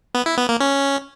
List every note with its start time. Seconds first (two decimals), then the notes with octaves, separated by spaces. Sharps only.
0.15 B3
0.26 E4
0.37 B3
0.49 A#3
0.60 C#4